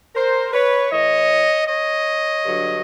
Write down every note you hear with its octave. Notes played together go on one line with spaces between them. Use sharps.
A#4 C5
B4 C#5
A2 E3 C#5 D#5
C#5 D#5
G2 D3 F#3